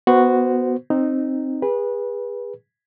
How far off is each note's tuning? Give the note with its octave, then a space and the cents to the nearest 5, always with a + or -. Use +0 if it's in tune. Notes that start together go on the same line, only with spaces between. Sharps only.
B3 +0 F#4 +0 C5 -20
C4 +10 D#4 -10
G#4 -35 B4 -25